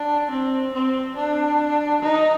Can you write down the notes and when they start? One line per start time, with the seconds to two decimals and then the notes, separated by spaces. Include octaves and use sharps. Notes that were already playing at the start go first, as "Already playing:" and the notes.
Already playing: D4
0.31 C4
0.73 C4
1.16 D4
2.02 D#4